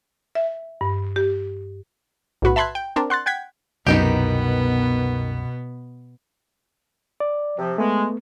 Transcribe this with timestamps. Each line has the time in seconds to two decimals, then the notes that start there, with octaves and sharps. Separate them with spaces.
0.35 E5
0.81 G2
1.16 G4
2.42 B1 A2 F#4 B4
2.56 E5 A5 B5 C6 F#6 G#6
2.75 G5
2.96 C4 D4 A#4
3.10 F#5 C6 F#6 A6
3.26 F#5 G5 G#6 B6
3.87 C2 F#2 B2 D#3 B3 D#4 G4
7.20 D5
7.58 C3 F3
7.78 G#3 A3 B3